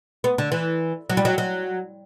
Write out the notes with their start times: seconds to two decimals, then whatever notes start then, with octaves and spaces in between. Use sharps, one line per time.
0.24 B3
0.38 D3
0.52 E3
1.10 F#3
1.17 G3
1.25 F#3
1.38 F#3